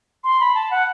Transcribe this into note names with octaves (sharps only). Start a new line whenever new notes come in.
C6
B5
A5
F#5